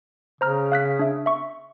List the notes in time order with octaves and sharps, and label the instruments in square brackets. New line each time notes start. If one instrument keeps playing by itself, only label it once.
[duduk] C#3 [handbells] C5 A#5 F6
[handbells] F5 F#6 B6
D4 E5
E5 C#6